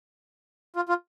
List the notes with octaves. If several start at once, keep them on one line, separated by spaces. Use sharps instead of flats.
F4
F4